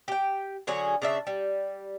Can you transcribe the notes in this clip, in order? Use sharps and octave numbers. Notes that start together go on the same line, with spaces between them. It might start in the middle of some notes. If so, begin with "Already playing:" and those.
G4 G5
D3 F#3 C#4 G#4
C#3 D4 E5
G3